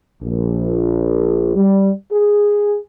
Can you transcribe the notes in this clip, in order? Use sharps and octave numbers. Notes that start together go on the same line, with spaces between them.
A#1
G3
G#4